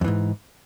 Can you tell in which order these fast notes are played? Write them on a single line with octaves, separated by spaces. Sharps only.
F2 E3 G#2